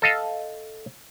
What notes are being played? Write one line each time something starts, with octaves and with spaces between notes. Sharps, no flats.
A4 D#5 F5